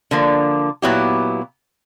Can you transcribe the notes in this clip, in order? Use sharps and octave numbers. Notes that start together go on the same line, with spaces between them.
D3 F3 A#3
A#2 F#3 B3 E4 G4